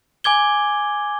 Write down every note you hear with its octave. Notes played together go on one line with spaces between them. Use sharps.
G#5 D6 G#6 G7